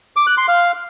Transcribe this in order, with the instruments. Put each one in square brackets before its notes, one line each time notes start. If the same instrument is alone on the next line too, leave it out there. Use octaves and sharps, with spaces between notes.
[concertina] D6
F#6
C6
F5